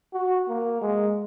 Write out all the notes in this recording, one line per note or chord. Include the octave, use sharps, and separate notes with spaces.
F#4
A#3
G#3